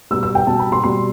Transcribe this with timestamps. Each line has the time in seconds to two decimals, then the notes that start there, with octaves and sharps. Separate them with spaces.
0.11 B2 G3 E6
0.23 E6
0.35 G5
0.47 B2 G3 A5
0.59 B5
0.72 C6
0.83 B2 G3 C6